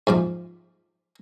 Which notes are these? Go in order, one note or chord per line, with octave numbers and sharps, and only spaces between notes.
G#2 F3 D6